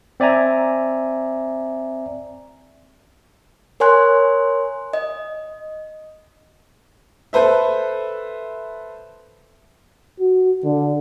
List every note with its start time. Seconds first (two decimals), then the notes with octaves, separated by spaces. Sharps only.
0.20 C4 D5 E5 G#5 A#5
3.80 A#4 C#5 G#5 C6 F#6
4.93 D#5
7.33 A4 B4 C5 E5
10.20 F#4
10.64 D3